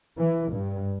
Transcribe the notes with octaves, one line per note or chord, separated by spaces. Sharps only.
E3
G2